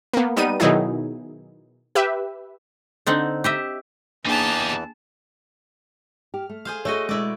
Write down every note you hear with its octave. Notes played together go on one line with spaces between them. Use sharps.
A#3 B3
G3 B3 D#4 D#7
B2 D#3 F#3 D#4 E4 G#4
G4 B4 E5
D3 C4 D#4 F#5
G4 D#5 E5
E2 E3 A#3 D4 D#4 G4 G#4 A5
G4 F6
A3
G#4 C5 F5
A3 F#4 G#4 C#5 D#5 C#6
B2 G#3 E4 D5